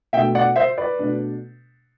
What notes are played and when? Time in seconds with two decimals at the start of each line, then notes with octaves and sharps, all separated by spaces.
0.13 B2 A3 D4 E5 G5
0.35 D5 F#5
0.56 C5 E5
0.77 B4 D5
0.99 B2 A3 D4